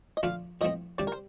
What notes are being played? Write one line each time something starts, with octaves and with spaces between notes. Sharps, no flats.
D#5
F3 A3 D4 F4 F5
A2 F3 A3 C4 D#5
C3 G3 D4 D5
A#4
C5